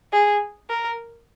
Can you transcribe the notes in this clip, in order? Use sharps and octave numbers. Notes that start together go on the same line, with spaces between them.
G#4
A#4